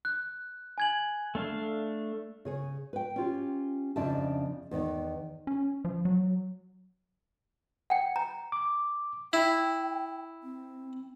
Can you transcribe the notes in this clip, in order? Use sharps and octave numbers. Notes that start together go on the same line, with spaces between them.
F#6
G#5 G#6 F#7
A3 D4 F5
C#3 G#4 C#5
B4 G5
C#4 F4 G4
F2 C#3 D4 D#4 E5 A5
E2 D#3 B3
C#4
F3
F#3
F#5 G5
A#5
D6
E4 G5
C4